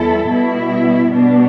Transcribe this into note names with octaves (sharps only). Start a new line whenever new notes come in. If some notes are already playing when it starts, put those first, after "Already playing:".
Already playing: E2 G3 E4 A4
B2 G3 E4
B2 G3 D4